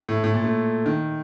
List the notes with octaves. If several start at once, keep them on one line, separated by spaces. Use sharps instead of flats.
A2
A2
A#2
A3
D#3